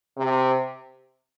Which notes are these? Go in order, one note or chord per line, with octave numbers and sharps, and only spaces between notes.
C3